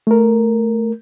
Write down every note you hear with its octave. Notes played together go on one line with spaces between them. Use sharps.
A3 A#4